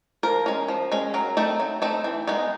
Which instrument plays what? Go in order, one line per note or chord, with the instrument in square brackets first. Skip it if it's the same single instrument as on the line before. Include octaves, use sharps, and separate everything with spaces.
[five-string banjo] F3 A#4
G#3 C#4
F3
G#3 C#4
F#3 A#4
A3 C4 D#4
F#3
A3 C4 D#4
E3
G#3 B3 D#4